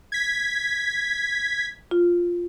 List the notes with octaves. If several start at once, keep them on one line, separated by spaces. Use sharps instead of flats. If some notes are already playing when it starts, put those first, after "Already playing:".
G#6 B6
F4